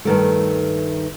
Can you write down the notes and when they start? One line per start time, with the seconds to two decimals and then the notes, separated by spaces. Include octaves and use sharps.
0.05 G2 D#3 A3